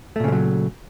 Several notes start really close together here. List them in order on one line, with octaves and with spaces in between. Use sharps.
A3 A#2 C#3 G#3 F#3